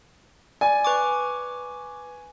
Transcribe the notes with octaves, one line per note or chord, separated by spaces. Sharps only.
D5 G#5
B4 C#6 D6